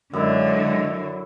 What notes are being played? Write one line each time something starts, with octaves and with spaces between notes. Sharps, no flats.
F#2 D3 F#3 G#3 E4